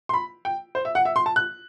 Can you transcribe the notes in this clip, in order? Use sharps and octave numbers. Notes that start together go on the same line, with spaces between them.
C6
B5
G5
C5
E5
F#5
E5
C6
A5
F#6